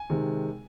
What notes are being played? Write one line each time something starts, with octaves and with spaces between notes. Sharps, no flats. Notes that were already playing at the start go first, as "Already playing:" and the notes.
Already playing: G#5
C3 D#3 G#3